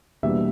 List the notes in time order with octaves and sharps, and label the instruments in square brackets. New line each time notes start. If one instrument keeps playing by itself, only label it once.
[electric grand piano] E2 B2 G3 A#3 D4 E5